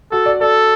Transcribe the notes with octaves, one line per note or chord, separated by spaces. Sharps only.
F#4 A4
D5
A4 D5